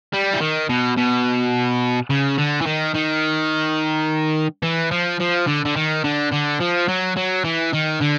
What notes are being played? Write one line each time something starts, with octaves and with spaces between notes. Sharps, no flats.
G3
E3
D#3
B2
B2
C#3
D3
E3
D#3
D#3
E3
F3
F3
D3
D3
D#3
D3
D3
F3
F#3
F#3
E3
D#3
D3